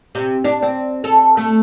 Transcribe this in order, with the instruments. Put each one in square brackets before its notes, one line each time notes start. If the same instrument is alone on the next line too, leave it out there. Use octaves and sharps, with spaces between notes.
[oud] C3
D4
C4
A4
A3